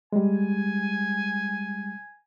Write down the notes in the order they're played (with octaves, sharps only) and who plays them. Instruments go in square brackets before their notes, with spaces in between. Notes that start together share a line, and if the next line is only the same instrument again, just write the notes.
[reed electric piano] G3 G#3 [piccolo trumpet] G#5